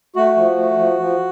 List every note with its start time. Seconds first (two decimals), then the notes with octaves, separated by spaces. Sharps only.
0.16 A3 F#4
0.37 F3
0.57 A3
0.79 F3
1.00 F3